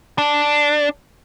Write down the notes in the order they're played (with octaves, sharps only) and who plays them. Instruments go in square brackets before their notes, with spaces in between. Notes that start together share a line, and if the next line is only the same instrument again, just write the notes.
[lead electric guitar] D4